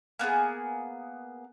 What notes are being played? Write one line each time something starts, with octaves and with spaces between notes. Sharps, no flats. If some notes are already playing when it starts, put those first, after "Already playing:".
A#3 B3 D#4 G#4